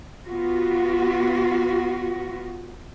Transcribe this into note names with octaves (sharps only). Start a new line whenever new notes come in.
B3 F4 F#4